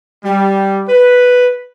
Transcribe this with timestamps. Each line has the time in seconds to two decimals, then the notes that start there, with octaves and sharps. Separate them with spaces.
0.24 G3
0.88 B4